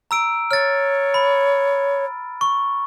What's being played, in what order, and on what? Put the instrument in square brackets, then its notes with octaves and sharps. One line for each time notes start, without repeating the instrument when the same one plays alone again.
[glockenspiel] A#5 E6 D7
[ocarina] C#5 [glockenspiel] F6 A6
[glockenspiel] B5
C#6